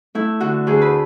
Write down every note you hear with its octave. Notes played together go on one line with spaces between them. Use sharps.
A3 E4
D3 F#4
D2 G#4
B4